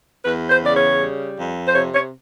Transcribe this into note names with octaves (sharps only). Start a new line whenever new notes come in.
E2 B4
C5
C#3 D5
C#5
G3
F2
C5
C3 C#5
C#5